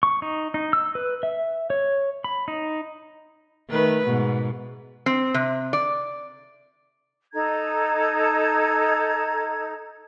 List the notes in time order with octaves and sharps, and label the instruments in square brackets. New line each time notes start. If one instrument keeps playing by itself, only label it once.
[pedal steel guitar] C#6
D#4
D#4
E6
B4
E5
C#5
B5
D#4
[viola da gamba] D#3 A3 B4
G#2 B2
[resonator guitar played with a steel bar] C4
C3
D5
[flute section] D#4 A4 A#5 G#6